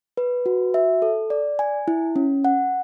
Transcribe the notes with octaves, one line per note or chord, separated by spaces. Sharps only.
B4
F#4
E5
A4
D5
G#5
E4
C#4
F#5